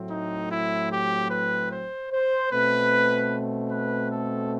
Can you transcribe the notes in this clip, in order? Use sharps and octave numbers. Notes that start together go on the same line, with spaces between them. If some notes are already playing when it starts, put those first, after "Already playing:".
Already playing: A2 F#3 A3 C4
D#4
E4
G4
B4
C5
C5
B2 A3 C4 B4
B4
A4